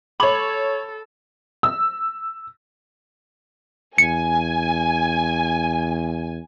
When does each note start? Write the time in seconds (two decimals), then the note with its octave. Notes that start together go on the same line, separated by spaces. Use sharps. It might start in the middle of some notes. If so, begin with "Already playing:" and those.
0.20 A4 C#5 B5 D6 F#7
1.63 E6
3.98 E2 G#5 C#7